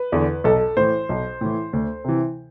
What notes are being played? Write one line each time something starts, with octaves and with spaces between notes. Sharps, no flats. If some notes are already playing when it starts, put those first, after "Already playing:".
Already playing: B4
E2 D3
B1 A4
A2 E3 C5
B1
A2 E3
D2
C3 E3